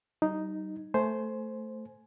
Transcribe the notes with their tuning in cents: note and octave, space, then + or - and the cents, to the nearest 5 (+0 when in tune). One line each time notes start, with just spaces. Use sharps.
G3 -35 D#4 +0
A3 +0 C5 +0 G#5 +20